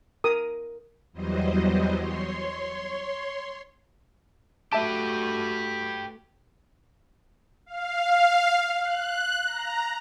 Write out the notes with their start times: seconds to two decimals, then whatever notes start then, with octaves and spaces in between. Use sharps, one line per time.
0.24 A#4 D#6
1.13 E2 E3 F#3 G3 C5 D#5
1.95 C#5 C6
4.73 A3 F#4 G4 B4 E5 A5
7.66 F5
8.79 F#6
9.46 A#5